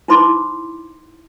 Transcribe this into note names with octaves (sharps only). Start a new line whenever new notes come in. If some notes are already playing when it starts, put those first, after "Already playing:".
D#4 E4 C5 B5 C6 D6